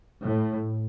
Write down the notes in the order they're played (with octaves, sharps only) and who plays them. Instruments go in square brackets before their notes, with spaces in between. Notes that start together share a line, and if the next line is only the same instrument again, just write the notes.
[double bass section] A2